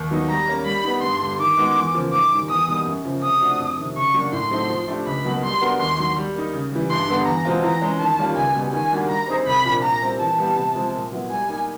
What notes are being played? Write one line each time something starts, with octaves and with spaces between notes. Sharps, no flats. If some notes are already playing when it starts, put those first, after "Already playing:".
Already playing: D#2
D#3 F#3 B3 D#4
G3 A#5
A#3 C#4
G3 B5
B3 D#4
G2 C6
D3 G3
D#3 D6
G#3 B3 D#4 F#4
E2
C#3 F3 A#3
G#2 D6
D#3 G3
E2 D#6
B2 G3 A#3 D#4
F#2
C#3 F3
C3 D#6
F3 A3 D4 F#4
F2
C3 D#3
C#3 C#6
F#3 A#3 D4 F#4
A2 C6
F#3 A3 C4 D#4
F3
A3 D4 G4
C#2 B5
B2 F#3 A#3
G3 C6
B3 D4 F#4 A#4
D#2 C6
D#3 F#3
G3
A#3 D#4
C#3
E3 G3
G2 C6
D3 G3 B3
E2 A#5
B2 G#3 C4 F4
E3 A#5
G#3 C#4
D#3 A5
G3 A#3 C#4 F4
C#2 G#5
B2 G3
D#3 G#5
G3 A#3 D4 F#4
G3 A#5
C4 D#4 G#4 C5
C2 B5
A#2 F3 A#3 D4
A#2 A#5
G3 C4 E4
E3 A5
G3 B3 E4 G4
C3
F3 G#3 C4
A#2
F#3 B3 E4
G3 G#5
A#3 D#4 G4